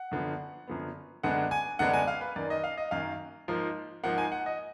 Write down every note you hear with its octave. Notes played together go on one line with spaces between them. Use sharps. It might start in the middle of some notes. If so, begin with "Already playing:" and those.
Already playing: F#5
F#2 D3 F3 B3
F#2 D3 F3 B3
F#2 D3 G#3 B3 D4 F#5
G#5
F#2 D3 G#3 B3 D4 F#5
G#5
F5
B4
F#2 D#3 A#3 D5
D#5
F5
D#5
F#2 D#3 A#3 F5
G#2 F3 A#3
G#2 F3 A#3 F#5
G#5
F#5
D#5